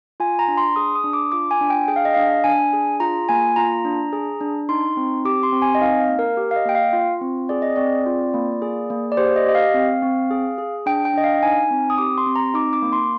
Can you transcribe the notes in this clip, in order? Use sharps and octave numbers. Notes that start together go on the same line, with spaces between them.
F4 G#5
A#5
D4
C6
G#4 D#6
D#6
D4
D6
F4 D6
G#5
D4
G5
G#4 G5
F5
D#5
D4 F5
D4 G#5
G#4
F4 A#5
A#3 G#5
F4 A#5
D4
G#4
D4
D#4 C6
C4
G4 D6
C6
C4
G#5
D#5
D#4 F5
F5
A#3
A#4
G4
F5
D#5
A#3 G5
F5
F4
C4
G#4 D5
D#5
C4 D5
F4
A#3
G#4
A#3
D5
G4 C5
D#5
G4 D#5
F5
C4
C4
G#4
G#4
D4 G5
G5
D4 D#5
F5
D#4 G#5
C4
D#6
G4 D6
C6
C4
A#5
D#4 D6
D6
A#3
C6